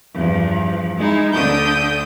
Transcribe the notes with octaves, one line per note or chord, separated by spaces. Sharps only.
E2 G2 F3
G#3 D#4 E4
D2 D3 D4 G5 D#6 G6